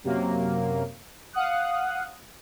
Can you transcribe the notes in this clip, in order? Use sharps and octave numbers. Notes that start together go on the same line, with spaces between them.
F#2 C3 F#3 A#3
F5 F#5 D#6 F#6